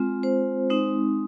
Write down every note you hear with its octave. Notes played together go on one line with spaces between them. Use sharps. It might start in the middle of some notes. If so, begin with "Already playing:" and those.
Already playing: G#3 C4 F4
C5
G#3 C4 D#4